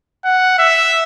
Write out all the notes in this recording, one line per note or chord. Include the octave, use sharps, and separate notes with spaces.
F#5
E5